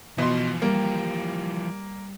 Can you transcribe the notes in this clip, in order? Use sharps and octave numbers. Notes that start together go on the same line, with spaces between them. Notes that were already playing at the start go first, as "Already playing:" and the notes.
B2 E3 F3 C6
G3 A#3